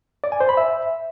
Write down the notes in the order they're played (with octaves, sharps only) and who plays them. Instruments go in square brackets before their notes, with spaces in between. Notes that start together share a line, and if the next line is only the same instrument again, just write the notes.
[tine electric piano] D5
G#5
C5
B5
E5